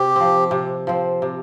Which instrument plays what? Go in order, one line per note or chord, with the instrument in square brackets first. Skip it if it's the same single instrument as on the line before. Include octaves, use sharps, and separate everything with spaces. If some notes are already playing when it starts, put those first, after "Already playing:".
Already playing: [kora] C3 [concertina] G4
[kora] F3 C4
C3
F3 C4
C3